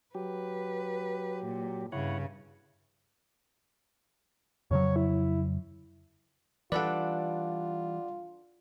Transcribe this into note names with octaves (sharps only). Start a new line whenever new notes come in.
F#3 G4 B4
A#2
G2 C#3 E4 C#5 F#5
F2 C#3 F#3 C#5
E4
E3 G3 D4 F4 A4 B4 D5 F#5